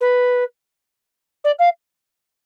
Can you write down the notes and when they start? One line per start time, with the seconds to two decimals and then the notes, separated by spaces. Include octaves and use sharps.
0.01 B4
1.44 D5
1.59 F5